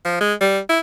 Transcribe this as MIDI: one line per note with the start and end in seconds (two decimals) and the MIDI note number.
0.05 0.17 53
0.21 0.34 56
0.41 0.59 55
0.69 0.79 64